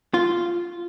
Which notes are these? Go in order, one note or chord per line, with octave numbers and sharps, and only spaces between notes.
F4